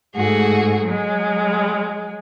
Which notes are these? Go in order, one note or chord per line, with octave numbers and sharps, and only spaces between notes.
G#2 A3 F#4 G#4
F#3 G#3